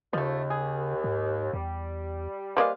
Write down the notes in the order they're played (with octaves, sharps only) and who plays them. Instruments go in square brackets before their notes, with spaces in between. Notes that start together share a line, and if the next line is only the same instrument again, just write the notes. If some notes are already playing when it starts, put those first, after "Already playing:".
[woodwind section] D#2 [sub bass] C#3 [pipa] F3 A3 [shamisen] D#5
[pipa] G#4
[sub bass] G#2
[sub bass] E2 [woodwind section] G3
[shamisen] G3 A#3 D#5 [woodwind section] G#4 B4 [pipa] C5 D5 F5